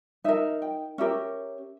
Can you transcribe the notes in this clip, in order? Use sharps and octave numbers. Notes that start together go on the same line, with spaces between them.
D#4 A#4 E5
G5
C#4 G4 A#4 E5